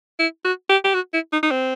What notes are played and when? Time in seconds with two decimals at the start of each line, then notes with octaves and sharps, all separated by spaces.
0.19 E4
0.45 F#4
0.69 G4
0.84 G4
0.94 F#4
1.13 E4
1.32 D#4
1.43 D#4
1.51 C4